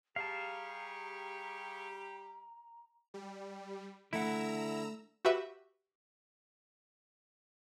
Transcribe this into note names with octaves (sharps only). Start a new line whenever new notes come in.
G3 G4 G#4 F5 A5 A#5 C#6
G3
D3 A3 E4 F#5 A#5 E6
F#4 G4 B4 E5